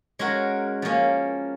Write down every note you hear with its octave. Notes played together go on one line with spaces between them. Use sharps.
G#3 C#4 F#4 A#4
F3 A#3 C#4